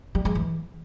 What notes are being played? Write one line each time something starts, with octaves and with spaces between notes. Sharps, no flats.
G3
G#3
E3